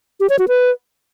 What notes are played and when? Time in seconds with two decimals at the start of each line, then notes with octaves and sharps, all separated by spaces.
0.20 G4
0.29 C#5
0.39 F#4
0.48 B4